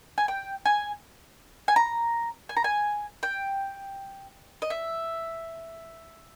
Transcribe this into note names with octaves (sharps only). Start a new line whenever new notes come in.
G#5
G5
G#5
G#5
A#5
G#5
A#5
G#5
G5
D#5
E5